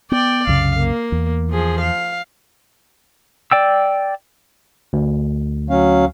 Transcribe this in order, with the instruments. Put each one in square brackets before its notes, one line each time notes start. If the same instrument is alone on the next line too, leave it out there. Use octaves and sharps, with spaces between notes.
[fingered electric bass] B3 [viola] D5 G5
[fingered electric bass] C2 F#2 C#3 [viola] F5
[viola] A#3
[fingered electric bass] E2
[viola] F3 G#4
F5
[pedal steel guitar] D5 G5 E6
[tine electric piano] D2
[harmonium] F#3 C#4 F5